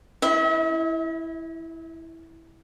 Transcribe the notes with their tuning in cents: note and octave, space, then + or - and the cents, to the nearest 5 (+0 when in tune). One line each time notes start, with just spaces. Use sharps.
E4 -5 E5 -45